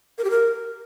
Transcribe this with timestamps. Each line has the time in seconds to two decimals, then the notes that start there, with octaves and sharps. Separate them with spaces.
0.18 A#4
0.24 G4
0.30 A#4